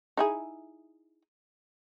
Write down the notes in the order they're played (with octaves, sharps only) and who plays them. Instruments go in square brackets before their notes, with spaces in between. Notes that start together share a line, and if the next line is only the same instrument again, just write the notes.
[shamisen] D#4 E4 G#4